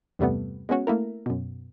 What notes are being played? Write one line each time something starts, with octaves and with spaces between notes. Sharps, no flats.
E2 G2 C3 G3 A3 B3
G#3 B3 C#4 F#4
A3 A#3 E4 A#4
F#2 B2